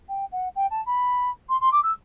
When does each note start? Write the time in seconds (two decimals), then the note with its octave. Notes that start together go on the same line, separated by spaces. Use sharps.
0.09 G5
0.32 F#5
0.55 G5
0.71 A5
0.86 B5
1.49 C6
1.61 C6
1.72 D6
1.83 E6